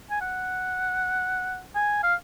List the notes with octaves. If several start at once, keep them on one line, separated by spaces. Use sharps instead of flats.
G#5
F#5
G#5
F5